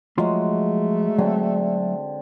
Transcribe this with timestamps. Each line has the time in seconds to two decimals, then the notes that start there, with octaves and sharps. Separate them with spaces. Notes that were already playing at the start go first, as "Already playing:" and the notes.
0.18 F3 F#3 G#3 A3 F4 C6
1.18 D3 F#3 C4